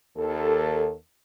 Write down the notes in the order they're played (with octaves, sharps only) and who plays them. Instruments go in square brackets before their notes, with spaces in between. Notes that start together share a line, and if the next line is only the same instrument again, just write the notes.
[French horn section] D#2 A4